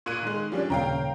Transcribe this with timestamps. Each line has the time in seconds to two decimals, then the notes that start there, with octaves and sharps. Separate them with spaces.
0.06 A#2 F#6 D#7
0.23 D#3 G#3
0.52 F3 G3 C#4 D4
0.70 D#1 C#3 C#5 F5 G5 A#5